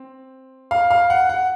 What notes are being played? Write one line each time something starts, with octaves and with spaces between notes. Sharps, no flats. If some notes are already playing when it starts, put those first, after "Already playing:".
Already playing: C4
F5
F5
F#5
F#5